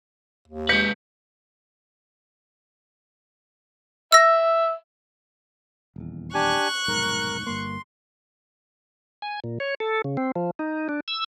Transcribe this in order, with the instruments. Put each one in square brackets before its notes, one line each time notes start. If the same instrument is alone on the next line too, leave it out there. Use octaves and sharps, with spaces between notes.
[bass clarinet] D#2
[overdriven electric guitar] G#3 B4 [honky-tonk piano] G6 B6 C#7
[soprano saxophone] E5 [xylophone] E6 A#6
[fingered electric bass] D#1 E2
[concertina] D4 G4 G#5 [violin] C#6 F#6
[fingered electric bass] F1 B1 G#2 [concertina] A#4
[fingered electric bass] G1 G2 A#3 [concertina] C6
[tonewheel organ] G#5
A#2
C#5
A4
C#3
C4
F3
D#4
D4
E6